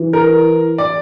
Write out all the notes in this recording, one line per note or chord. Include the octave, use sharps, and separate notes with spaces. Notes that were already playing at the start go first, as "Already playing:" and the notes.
Already playing: E3
A#4
D5